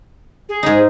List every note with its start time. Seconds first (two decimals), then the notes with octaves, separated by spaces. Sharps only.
0.49 G#4
0.63 G#2 D#4